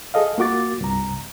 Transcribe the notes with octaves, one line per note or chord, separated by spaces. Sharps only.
G#4 A4 D#5 F5
A#3 F4 F#4 D6 A6
C2 G2 C3 A#5